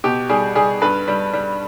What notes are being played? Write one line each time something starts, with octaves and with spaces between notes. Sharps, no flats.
B2 G4
G3 G#4
G3 G#4
G2 B4
G3
G3